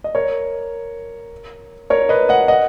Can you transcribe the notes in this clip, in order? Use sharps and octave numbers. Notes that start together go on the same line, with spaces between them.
D#5
A#4 C#5
A#4 C#5
B4 D#5
D#5 F#5
D#5 F#5